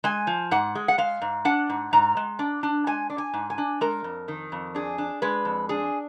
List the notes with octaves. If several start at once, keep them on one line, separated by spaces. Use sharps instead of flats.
G#3 G#5
F3
G#2 F#5
G#3
F#5
G#3 F5
G#2
D4 F#5
G#2
G#2 A#5
G#3
D4
D4
G#3 G#5
D4
G#5
G#2
G#5
D4
G#3 A#4
F2
D#3
F2
D4 G#4
D4
G#3 B4
F2
D4 G#4